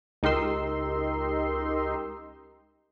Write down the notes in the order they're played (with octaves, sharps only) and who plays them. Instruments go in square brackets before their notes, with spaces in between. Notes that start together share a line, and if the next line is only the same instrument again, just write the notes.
[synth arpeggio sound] C#2 D#4 G4 A#4 C6 E6